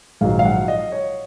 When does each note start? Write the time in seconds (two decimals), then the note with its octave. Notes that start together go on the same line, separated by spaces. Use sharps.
0.21 A#1 G#2 D#3 F#3 F5
0.39 F5
0.45 F#5
0.68 D#5
0.92 C#5